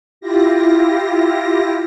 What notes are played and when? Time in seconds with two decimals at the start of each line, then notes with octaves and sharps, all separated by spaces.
0.21 E4 F4 G4 A#6